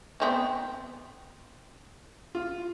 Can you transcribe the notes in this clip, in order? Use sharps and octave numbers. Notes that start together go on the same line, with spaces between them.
B3 C4 D#4
F4